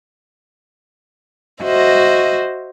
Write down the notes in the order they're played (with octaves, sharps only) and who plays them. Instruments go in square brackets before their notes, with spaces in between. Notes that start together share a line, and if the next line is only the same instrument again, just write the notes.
[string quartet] F#4 C5 D#5 E5